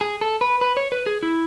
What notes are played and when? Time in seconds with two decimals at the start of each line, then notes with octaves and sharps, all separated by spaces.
0.01 G#4
0.21 A4
0.41 B4
0.61 B4
0.77 C#5
0.92 B4
1.06 G#4
1.23 E4